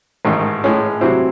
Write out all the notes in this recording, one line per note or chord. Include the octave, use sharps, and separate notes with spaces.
A1 G#2 D#3
A2 G#3 C#4
C3 F#3 C4 E4 C5